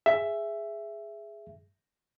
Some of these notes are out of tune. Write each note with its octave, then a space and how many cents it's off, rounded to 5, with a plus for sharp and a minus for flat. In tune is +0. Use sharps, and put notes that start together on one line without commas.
G#4 +0 E5 +10